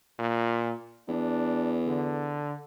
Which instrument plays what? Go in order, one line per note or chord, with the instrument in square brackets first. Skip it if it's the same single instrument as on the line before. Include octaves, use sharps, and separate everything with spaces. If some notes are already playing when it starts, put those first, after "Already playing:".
[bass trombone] A#2
[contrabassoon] E2 [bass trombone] D4
[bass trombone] D3